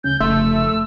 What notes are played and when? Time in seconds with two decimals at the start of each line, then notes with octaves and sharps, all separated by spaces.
0.04 D2 C#3 C#4 G6
0.20 F1 C#3 A3 C6 E6